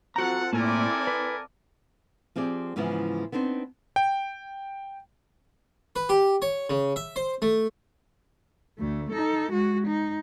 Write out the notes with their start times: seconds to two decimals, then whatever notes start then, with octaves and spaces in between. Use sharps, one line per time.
0.16 F3 C4 F#4 A4 F#5 A#5
0.53 A2 A#3 C4 E4 A4 A#4 D5 G#5
1.07 B4
2.36 F3 C4 G4 G#4 D5
2.76 G#2 C#3 E3 F3 B3 E4
3.32 B3 C4 D4 D#4 C5
3.96 G5
5.96 B4
6.09 G4
6.42 C#5
6.70 C#3
6.96 E5
7.16 C5
7.42 A3
8.79 D2 A3
9.12 D#4 A4
9.52 G#3 F#4
9.87 D#4